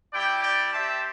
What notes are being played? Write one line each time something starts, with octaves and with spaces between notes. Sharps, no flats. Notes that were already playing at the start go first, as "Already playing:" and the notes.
G3 E4 G4 D5 G5
D5 G5
C4 G4 E5 A5